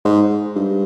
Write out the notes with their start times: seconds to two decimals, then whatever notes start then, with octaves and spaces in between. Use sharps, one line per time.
0.05 G#2
0.56 G2